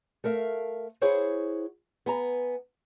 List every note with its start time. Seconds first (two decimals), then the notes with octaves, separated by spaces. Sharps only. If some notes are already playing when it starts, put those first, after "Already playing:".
0.24 A3 A#4 E5 F5
1.01 E4 G#4 C5 C#5 F#5
2.06 B3 G#5 A#5